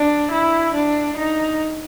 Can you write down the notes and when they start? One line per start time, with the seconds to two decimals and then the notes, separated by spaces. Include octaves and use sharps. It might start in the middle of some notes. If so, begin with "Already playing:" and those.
Already playing: D4
0.31 E4
0.74 D4
1.18 D#4